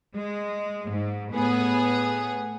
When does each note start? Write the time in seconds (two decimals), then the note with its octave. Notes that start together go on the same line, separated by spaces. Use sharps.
0.16 G#3
0.91 G#2
1.33 A2 B3 G#4